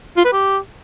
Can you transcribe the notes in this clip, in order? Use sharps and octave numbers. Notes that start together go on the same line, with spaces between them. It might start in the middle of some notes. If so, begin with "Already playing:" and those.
F4
B4
G4